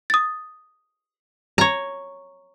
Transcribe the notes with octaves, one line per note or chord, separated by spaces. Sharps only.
D#6 A6
C#5 A#5